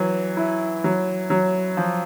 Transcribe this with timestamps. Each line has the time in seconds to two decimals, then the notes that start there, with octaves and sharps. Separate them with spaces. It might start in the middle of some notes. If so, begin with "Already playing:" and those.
Already playing: E3 F#3
0.37 E4
0.84 F#3
1.30 F#3
1.77 F3